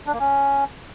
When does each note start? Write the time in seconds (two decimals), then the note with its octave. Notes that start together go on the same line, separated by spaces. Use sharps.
0.06 D4
0.13 A#3
0.20 C#4